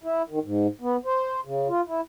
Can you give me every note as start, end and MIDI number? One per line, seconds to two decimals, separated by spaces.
0.04 0.22 64
0.30 0.39 51
0.44 0.67 44
0.81 0.97 59
1.05 1.40 72
1.45 1.68 49
1.69 1.81 65
1.87 2.01 64